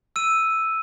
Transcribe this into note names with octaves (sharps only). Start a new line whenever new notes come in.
E6 D#7